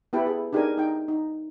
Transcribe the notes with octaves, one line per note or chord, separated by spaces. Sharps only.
B3 E4 G4 A4 B4 G5
G#4
D4 D#4 G4 G#4 A#4 G#5
D#4 G5
D#4